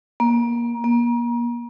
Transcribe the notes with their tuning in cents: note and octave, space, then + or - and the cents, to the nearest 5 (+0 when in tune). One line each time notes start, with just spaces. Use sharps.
A#3 +25
A#3 +35